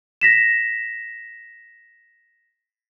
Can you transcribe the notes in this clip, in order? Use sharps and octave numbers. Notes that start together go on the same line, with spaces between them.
A#6 B6 E7